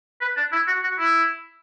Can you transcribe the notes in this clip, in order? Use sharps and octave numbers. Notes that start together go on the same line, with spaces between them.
B4
D4
E4
F#4
F#4
E4